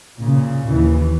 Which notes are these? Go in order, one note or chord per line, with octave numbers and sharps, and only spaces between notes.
A#2 C#3
D#2 E3